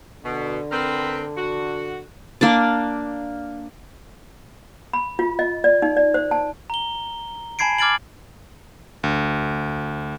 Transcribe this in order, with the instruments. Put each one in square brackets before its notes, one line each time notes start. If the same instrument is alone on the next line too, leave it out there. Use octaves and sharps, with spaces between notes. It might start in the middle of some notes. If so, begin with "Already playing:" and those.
[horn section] B2 [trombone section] D3
[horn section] C4 A#4 B4
F#4
[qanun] A#3 D4 D5
[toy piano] B5
F4
D#5
D5
D#4
D5
C5
A5
[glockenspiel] A#5 G7
G#5 A5 B5 G#6 C7 D7
D6 F6 G#6 A6 D7 F#7
[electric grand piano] D2